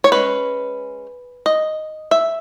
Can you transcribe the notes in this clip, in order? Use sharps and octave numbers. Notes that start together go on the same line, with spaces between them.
C#5
G#3 C#4 B4
D#5
E5